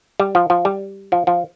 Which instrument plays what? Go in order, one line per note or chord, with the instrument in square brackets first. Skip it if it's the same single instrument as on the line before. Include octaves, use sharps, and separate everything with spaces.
[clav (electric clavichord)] G3
F3
F3
G3
F3
F3